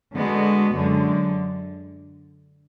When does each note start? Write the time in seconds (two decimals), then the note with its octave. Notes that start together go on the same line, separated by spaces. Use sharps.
0.14 D3 G#3 B3 F#4
0.74 F#2 D3 G#3